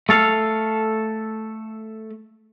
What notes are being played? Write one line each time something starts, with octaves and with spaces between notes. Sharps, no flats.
A3 A4 F5